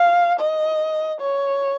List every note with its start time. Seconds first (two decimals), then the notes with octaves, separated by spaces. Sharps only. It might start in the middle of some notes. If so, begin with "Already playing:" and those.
Already playing: F5
0.40 D#5
1.20 C#5